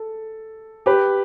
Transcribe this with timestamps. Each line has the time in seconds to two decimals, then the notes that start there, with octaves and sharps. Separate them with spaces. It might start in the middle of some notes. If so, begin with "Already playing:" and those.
Already playing: A4
0.86 G4 B4